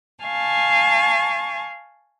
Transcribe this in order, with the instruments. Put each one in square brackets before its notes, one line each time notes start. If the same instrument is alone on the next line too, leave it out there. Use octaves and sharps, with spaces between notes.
[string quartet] F5 G#5 A5 C#6